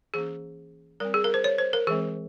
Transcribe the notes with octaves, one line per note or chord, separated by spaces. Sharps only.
E3 A#3 C#4 G#4
G3 C4 A#4
G#4
A#4
C5
C#5
C5
A#4
E3 G#3 C4 G#4